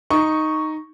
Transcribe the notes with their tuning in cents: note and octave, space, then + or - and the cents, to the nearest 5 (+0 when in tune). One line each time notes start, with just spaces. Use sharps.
D#4 +0 C#6 +0